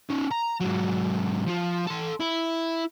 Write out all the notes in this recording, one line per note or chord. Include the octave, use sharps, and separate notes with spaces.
C#4 D#4
A#5
G#2 F#3
F3 F4
A4 C6
E4